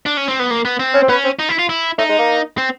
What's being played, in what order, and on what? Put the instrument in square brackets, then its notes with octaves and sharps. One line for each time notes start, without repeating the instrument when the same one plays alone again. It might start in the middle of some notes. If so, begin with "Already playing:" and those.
[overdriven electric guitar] D4
C#4
C4
B3
A#3
B3
C4
[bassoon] C#4
C4
[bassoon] B3 [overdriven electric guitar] C#4
[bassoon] C4
[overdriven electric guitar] D#4
E4
F4
E4
[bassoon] A3 [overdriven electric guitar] D#4
[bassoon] G#3
A#3
[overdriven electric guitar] C4